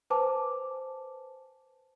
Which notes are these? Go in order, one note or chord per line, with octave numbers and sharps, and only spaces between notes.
B4 C5 G#5 A5 D6